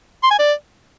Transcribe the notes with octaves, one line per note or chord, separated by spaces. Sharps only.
C6
G#5
D5